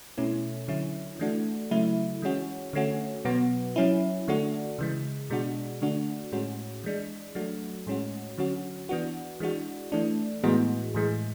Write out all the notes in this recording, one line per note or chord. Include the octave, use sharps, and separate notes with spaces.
B2 A3 C#4 E4
D3 F#3 C#4 E4
E3 A3 D4 F#4
C#3 F#3 A3 E4
E3 G#3 C#4 F#4
D3 A3 C#4 F#4
B2 F#3 B3 F#4
F#3 C#4 E4
D3 A3 D4 F#4
C#3 E3 G#3
B2 G#3 D4 F#4
D3 A3 D4 F#4
A2 G#3 C#4 F#4
E3 G#3 D4
F#3 A3 D4 F#4
A2 G#3 C#4 F#4
D3 F#3 C#4 F#4
E3 B3 D4 F#4
E3 G#3 D4 F#4
E3 A3 D4
A2 E3 G#3 B3 F#4
A2 E3 G#3